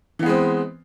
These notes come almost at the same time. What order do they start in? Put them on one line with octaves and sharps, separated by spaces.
E3 B3 G#3 C4